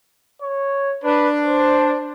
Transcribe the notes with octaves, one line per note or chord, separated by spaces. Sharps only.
C#5
D4 B4
C5